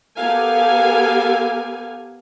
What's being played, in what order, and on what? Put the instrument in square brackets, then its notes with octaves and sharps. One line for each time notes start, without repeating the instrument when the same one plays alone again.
[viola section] B3 G4 A4 A#4 F5 G#5